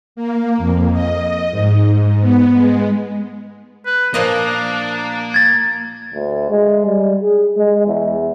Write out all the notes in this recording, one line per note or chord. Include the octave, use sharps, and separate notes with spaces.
A#3
F2
D#5
G#2
B3
G#3
B4
A#2 F3 A#3 D4 D#5
G#6 A6
D2
G#3
G3
G#4
G#3
E2